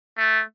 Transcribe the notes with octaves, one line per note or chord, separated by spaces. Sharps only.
A3